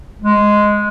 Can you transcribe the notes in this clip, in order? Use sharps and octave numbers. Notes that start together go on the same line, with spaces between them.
G#3